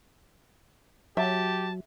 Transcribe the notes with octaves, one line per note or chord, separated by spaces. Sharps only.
F#3 G4 E5 A5